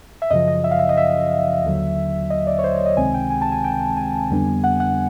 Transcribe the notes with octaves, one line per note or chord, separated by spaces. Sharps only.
E5
F#2 C#3 F3 D#5
D#5
E5
F5
E5
D#5
E5
D#2 D3 F#3
D#5
D5
C#5
C5
C#5
D#5
C#2 C3 D#3 G#3 C4 G#5
G5
G#5
A5
G#5
G5
G5
G#5
F2 D3 G3 B3 D4
F#5
F#5